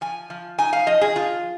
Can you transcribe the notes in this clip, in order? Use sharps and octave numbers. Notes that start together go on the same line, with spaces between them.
F3 G#5
F3
D#4 G#5
F5
F3 D#5
G#4
F3 F4